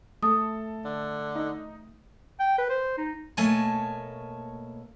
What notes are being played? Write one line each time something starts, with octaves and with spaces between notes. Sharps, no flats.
A3 A4 D#6
D3
D#4
G5
B4
C5
D#4
B2 A3 A#3 C#5 G#5 A5